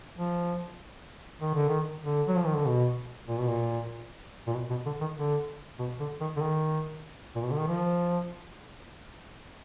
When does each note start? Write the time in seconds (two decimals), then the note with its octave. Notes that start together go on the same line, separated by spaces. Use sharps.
0.16 F3
1.41 D#3
1.55 D3
1.69 D#3
2.03 D3
2.28 F#3
2.37 F3
2.47 D#3
2.56 D3
2.66 B2
3.28 A#2
3.39 B2
3.47 A#2
4.47 A#2
4.54 B2
4.70 B2
4.86 D3
5.01 D#3
5.17 D3
5.79 B2
6.00 D3
6.21 D#3
6.37 D3
6.42 D#3
7.36 A#2
7.43 B2
7.51 D3
7.59 D#3
7.68 F3